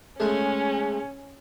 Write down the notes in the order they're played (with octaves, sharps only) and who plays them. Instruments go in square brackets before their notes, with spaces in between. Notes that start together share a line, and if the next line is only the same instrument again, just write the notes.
[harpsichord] G#3 A3 [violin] C#4